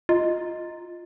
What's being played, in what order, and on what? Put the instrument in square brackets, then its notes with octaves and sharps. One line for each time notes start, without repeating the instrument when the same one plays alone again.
[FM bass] F4 [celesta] D#5 A#5 A6